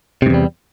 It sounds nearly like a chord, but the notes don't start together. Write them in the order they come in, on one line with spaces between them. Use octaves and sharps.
C3 G#2 E2 G3